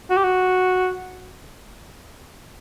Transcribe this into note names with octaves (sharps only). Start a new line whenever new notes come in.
F#4
G4
F#4